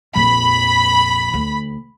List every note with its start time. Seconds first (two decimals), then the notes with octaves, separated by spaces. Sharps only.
0.15 A#1 F2 B5
1.34 D2